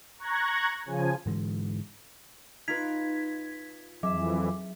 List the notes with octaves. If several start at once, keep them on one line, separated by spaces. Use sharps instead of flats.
A#5 C#6 F#6 G#6 A#6
C#3 F3 G#5
G#2 D3 E3 G#3
D#4 F4 B4 G#6 B6
F2 E3 F#3 G#4 E5 D6